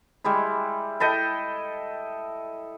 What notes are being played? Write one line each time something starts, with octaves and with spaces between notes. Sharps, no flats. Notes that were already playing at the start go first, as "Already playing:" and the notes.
G3 G#3 E4
E4 A4 D#5 G5